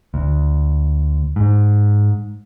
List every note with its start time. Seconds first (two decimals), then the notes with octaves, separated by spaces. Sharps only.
0.14 D2
1.36 G#2